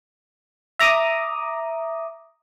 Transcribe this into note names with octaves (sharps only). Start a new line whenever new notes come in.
E5 A#5 D6 D#6